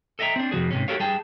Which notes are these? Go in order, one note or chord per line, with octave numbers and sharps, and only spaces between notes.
A4 D#5 E5 G5 A#5
C4 D4
F2 C3 E3 F#4 G#4
G#2 C3 C#4
F#4 G4 A4 A#4 C#5 F5
G3 G#4 G5 A5